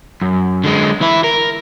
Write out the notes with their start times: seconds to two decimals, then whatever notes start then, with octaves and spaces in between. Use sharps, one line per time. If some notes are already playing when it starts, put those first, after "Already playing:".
0.22 F#2
0.64 D3 G#3
1.01 E3 E4
1.24 A#4